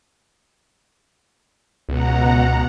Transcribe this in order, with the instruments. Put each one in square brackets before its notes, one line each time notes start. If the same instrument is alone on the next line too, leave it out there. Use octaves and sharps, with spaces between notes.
[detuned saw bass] C#2 [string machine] B2 F#5 A#5